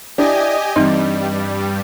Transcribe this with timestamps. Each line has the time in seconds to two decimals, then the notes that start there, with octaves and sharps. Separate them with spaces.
0.18 D4 E4 G4 D#5 G#5
0.76 G2 E3 G3 C4 D#4 C6